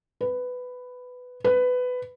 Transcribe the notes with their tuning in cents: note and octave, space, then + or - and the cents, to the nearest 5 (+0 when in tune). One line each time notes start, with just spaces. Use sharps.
B4 +10
B4 +15